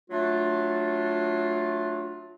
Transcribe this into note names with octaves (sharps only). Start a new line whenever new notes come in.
F#3 A3 D4 F4